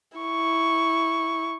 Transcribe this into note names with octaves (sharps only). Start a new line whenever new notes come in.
E4 C#6